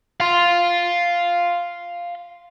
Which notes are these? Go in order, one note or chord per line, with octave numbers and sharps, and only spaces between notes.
F5 C6